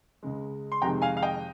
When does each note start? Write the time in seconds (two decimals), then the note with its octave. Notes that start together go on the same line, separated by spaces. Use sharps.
0.23 C#2 C#3 G#3
0.72 C6
0.82 F2 C3 D#3 G#3 G5 A#5
1.02 F5 G#5
1.17 F5
1.23 D#5 G5